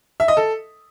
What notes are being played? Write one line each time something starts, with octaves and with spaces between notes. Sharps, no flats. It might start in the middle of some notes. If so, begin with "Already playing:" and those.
E5
D#5
A4